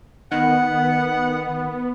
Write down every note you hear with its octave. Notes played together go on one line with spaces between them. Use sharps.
D#3 B3 F#5